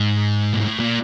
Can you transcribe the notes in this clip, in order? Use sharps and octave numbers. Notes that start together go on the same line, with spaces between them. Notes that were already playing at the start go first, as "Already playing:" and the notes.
Already playing: G#2
A#2
A2
A#2